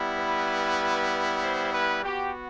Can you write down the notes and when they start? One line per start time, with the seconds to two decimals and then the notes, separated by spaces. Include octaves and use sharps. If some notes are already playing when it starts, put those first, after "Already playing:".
Already playing: G3 B3 E4
0.17 B4
1.42 C5
1.73 B4
2.04 B3 F#4 G4